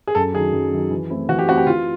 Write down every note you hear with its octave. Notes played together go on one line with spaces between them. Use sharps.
G#4
F#2 A4
D#3 F#3 G#4
F#2
D#3 F#3
E3
A3 C4 E4
E3 F#4
G4
A3 C4 E4 F#4
G4
E3 F4